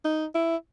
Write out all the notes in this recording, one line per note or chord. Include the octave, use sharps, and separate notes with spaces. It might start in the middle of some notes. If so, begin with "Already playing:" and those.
D#4
E4